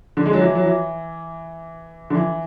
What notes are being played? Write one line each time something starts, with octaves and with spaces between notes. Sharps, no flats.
D3
G#3
F#3
E3
F#3
E3
D3
E3